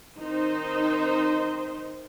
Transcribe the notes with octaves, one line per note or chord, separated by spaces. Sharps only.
D#3 C4 D#4 C5 D#5